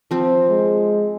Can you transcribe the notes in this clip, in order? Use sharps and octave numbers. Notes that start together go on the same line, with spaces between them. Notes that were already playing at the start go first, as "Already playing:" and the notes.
F3 C4
G#3